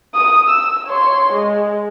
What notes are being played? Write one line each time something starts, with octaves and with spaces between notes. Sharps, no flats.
D#6
E6
C#5 C6
G#3